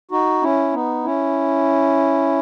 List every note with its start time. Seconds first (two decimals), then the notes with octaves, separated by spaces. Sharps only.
0.11 D#4 F#4
0.42 C#4 E4
0.74 B3 D#4
1.04 C#4 E4